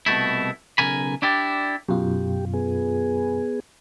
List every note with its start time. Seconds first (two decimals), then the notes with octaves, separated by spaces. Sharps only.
0.06 C2 B2 A3 E4
0.78 B1 G#2 C#3 A#4 G#5 B5
1.22 D4 E4 G4 D5
1.89 F#2 B2 F4 G4
2.54 B3 G#4